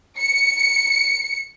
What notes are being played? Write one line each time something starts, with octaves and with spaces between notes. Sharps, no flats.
C#7